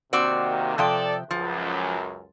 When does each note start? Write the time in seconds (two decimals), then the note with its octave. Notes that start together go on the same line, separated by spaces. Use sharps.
0.13 C3 D#3 A#3 C4 F#4 D5
0.78 C3 F3 A4 D5 G5
1.31 C#2 F#2 F3